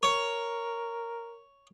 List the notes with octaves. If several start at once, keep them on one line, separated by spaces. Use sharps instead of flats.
A#4 C#5